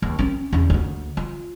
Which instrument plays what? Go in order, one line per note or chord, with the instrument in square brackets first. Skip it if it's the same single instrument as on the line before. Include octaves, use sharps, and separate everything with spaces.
[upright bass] D#2
C4 C#4
E2 C#4
D2 A#3
F4